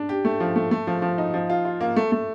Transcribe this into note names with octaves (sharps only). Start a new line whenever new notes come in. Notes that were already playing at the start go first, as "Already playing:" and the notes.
Already playing: D4
G4
A3
F3
A3
A3
F3
F3
D#4
F3
F4
F4
A#3
A3
A3